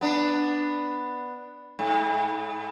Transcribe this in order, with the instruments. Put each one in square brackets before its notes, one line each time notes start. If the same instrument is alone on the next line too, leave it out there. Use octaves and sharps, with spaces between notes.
[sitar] B3 D4
G#2